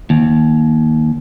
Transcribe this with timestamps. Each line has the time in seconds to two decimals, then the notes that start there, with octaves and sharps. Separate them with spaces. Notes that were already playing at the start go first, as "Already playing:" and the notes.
0.10 D#2